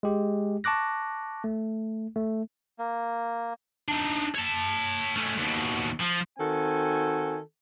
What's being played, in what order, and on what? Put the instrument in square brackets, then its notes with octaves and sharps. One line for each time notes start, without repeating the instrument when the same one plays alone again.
[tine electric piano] G#3 G4
A5 C#6 D6 F#6 A#6
A3
A3
[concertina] A#3
[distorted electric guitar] D4 D#4
C#5 A5
A3 C#4
D#2 B2
F3
[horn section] D#3 C4 F#4 A4 G#5